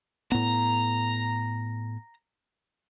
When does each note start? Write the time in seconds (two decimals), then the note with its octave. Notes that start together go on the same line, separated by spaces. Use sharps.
0.32 A2 B3 A#5